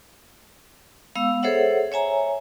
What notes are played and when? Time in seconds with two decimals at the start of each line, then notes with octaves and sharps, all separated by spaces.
1.16 G#3 B3 F5 E6
1.43 G#4 A4 C5 C#5 E5 F#5
1.92 C#5 E5 G#5 A#5